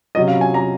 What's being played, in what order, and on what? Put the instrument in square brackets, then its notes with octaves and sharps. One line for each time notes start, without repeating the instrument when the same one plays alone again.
[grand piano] C3 F#3 C#4 D#5
F5
G#5
A#5